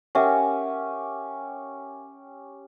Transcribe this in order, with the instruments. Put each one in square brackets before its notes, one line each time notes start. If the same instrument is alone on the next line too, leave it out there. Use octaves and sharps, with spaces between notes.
[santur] C#4 G4 [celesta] A#4 E5 F#5